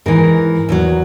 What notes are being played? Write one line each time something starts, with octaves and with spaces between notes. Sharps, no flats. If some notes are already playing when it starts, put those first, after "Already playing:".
G#2 E3 A#4
E2 D#3 F#3